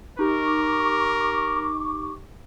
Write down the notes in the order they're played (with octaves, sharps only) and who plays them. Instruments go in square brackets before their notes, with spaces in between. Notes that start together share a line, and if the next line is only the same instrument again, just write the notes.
[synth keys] D#4 G4 [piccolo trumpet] A#4 [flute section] C#6 D6